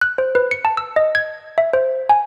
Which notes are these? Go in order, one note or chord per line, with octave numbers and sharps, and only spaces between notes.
F#6
C5
B4
C#7
A5
E6
D#5
G#6
E5
C5
G#5